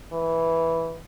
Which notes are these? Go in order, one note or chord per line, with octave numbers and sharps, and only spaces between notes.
E3